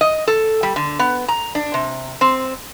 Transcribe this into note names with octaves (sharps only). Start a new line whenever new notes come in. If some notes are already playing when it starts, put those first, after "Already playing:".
D#5
A4
G3
D3
B3
A#5
D4
C3
C4